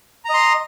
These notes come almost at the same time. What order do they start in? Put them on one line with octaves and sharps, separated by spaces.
A#5 D#5 C6